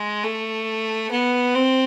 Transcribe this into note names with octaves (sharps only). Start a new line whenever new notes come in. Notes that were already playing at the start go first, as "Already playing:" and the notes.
Already playing: G#3
A3
B3
C4